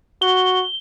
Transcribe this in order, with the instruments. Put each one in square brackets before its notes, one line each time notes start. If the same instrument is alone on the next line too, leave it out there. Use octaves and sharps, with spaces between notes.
[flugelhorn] F#4 [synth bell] G7